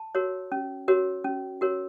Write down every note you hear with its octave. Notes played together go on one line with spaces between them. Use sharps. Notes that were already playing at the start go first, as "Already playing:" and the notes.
Already playing: A5
F#4 A#4 C#5
C#4
F#4 A#4 C#5
C#4
F#4 A#4 C#5